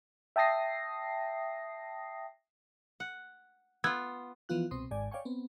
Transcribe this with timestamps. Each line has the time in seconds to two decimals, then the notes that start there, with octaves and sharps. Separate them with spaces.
0.36 E5 G5 A5 D#6 A#6 C7
3.00 F#5
3.84 B3 F4 E6 G#6
4.49 E3 F3 B3 F4 F#6
4.71 C2 B2 C4 C6 D#6
4.91 G#1 G#2 D5 G#5
5.11 C#5 D5 F5 G5 G#5 C#6
5.25 B3 C4